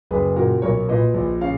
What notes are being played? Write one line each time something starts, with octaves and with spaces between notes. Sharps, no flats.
F#1 G#4 B4
A#2 F#4 A#4
B1 A#4 C#5
A#2 B4 D#5
A#1
C#3 C#5 F5